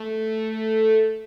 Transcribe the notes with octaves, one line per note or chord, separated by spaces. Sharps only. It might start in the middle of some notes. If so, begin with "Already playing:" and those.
Already playing: A3